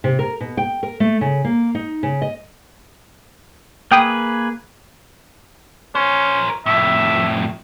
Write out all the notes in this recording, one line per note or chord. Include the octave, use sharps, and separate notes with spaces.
C3
A#4
B2
G5
A#4
A3
C#3
A#3
D#4
C#3
D#5
A#3 G#4 B4 G5 D#6
C#4 A#4 C5
F2 A2 E5